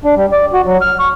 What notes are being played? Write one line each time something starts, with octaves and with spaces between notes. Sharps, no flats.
D4
G3
D5
F#4
F#3
F6
C#6